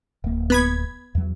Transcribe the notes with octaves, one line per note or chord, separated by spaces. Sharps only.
D1 A#3
B3 B5 G#6
E2 F#3